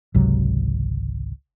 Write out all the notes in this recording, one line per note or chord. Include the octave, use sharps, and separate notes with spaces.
G#1 C#2 C3 F#3